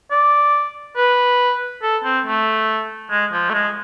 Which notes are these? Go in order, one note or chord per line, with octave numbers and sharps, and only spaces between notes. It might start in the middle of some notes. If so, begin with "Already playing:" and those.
D5
B4
A4
C4
A3
G#3
F3
A3
G#3